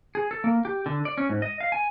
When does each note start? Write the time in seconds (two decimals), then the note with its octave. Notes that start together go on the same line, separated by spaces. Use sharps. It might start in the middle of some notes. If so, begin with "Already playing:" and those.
0.15 G#4
0.31 A4
0.44 A#3
0.65 G4
0.86 D3
1.05 D5
1.18 C#4
1.29 G#2
1.42 D#5
1.60 F5
1.72 G#5